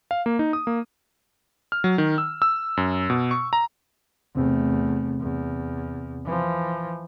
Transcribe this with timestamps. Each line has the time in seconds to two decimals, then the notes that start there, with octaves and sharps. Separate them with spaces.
0.11 F5
0.26 A#3
0.39 D#4
0.53 D#6
0.67 A#3
1.72 F6
1.84 F#3
1.98 D#3
2.18 E6
2.42 E6
2.77 F#2
3.10 B2
3.31 C#6
3.53 A#5
4.35 E2 C3 A3 C4
5.20 E2
6.25 E3 F3